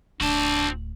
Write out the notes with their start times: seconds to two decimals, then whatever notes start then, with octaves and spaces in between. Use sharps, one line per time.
0.21 D1 C4 D4 F#4 A5